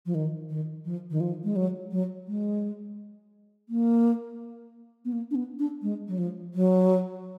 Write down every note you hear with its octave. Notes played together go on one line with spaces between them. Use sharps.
F3
D#3
D#3
F3
D#3
F3
G#3
F#3
F#3
G#3
A#3
B3
A#3
D4
B3
D4
G#3
F#3
F3
F#3